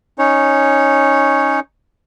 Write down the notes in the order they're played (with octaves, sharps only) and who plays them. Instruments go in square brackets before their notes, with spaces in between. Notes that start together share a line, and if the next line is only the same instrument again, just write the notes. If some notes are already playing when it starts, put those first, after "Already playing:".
[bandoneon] C#4 D#4 C#5